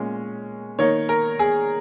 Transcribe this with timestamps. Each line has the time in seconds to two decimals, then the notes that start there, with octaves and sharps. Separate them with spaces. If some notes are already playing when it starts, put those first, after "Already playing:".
Already playing: A#2 G#3 C#4
0.79 D#3 A#3 D#4 C#5
1.09 A#4
1.39 G#4